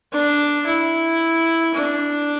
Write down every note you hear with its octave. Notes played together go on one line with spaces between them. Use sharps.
D4
E4
D4